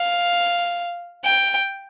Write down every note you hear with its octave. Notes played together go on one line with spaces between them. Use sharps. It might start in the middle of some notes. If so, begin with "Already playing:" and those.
Already playing: F5
G5